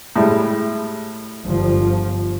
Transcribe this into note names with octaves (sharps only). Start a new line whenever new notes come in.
A2 G3 G#3
G1 F3